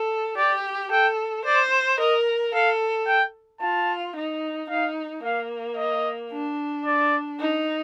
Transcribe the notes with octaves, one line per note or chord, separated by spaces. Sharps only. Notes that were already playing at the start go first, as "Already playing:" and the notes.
Already playing: A4
G4 D5
A4 G5
C5 D5
A#4 D#5
A4 F5
G5
F4 A5
D#4
D#4 F5
A#3 F5
D#5
D4
D5
D#4